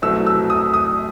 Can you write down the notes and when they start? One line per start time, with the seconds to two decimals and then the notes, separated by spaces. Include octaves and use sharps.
0.02 C2 B2 F#3 A3 C4 E6
0.26 E6
0.50 D#6
0.74 D#6